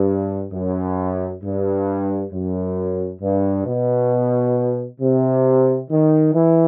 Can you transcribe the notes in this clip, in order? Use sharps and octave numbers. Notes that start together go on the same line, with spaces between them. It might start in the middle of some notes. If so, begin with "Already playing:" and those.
Already playing: G2
F#2
G2
F#2
G2
B2
C3
D#3
E3